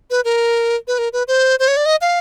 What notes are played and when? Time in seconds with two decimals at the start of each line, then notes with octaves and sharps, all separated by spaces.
0.10 B4
0.25 A#4
0.88 B4
0.98 A#4
1.13 B4
1.28 C5
1.59 C5
1.68 C#5
1.77 D5
1.86 D#5
2.01 F5